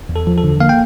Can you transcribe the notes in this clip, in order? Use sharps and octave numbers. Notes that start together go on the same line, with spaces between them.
E2
A4
F3
A4
D3
A#3 F5
G5